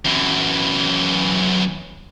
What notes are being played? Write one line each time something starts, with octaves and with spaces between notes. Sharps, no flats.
F#2 E3